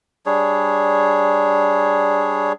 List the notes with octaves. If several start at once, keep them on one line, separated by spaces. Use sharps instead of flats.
G3 D4 G#4 C#5